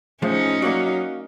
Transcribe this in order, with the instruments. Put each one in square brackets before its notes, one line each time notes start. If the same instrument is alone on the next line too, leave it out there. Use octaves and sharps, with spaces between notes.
[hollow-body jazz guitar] A2 F3 G#3 [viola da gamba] C#4 D#4
[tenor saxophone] F#3 [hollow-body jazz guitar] A#3 D5